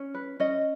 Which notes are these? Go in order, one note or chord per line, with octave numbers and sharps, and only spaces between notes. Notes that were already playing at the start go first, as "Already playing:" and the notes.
Already playing: C#4
B4
C#4 D#5